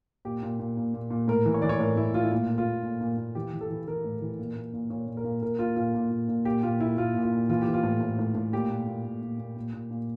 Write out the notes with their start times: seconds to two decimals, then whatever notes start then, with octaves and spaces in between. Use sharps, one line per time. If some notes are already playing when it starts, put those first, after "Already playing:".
0.25 A#2 G4
0.43 A#2
0.60 A#2
0.77 A#2
0.94 A#2
1.10 A#2
1.28 A2 A#4
1.45 E3
1.54 C#5
1.62 E3 D5
1.69 C#5
1.80 A2 A#4
1.97 A2 E4
2.14 A2 F4
2.23 E4
2.32 A#2 F4
2.50 A#2
2.58 F4
2.66 A#2
2.83 A#2
3.01 A#2
3.17 A#2
3.35 E3 G4
3.53 E3
3.61 A4
3.70 E3
3.87 E3 A#4
4.04 A2
4.22 E3
4.39 A#2
4.56 A#2
4.73 A#2
4.90 A#2 C#5
5.07 A#2
5.17 A#4
5.24 A#2
5.42 A#2 A#4
5.59 A#2 F4
5.76 A#2 F4
5.94 A#2
6.11 A#2
6.28 A#2
6.45 A#2 G4
6.63 A#2 F4
6.80 A#2 E4
6.97 A#2 F4
7.14 A#2
7.23 F4
7.33 A#2
7.49 E3 F4
7.61 G4
7.67 E3
7.74 F4
7.83 A2
8.00 A2
8.19 A2
8.35 A2
8.53 A#2 G4
8.70 A#2
8.87 A#2
9.05 A#2
9.22 A#2
9.39 A#2
9.57 A#2
9.73 A#2
9.91 A#2